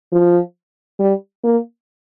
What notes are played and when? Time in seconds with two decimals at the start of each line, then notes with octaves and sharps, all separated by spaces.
0.12 F3
0.99 G3
1.44 A#3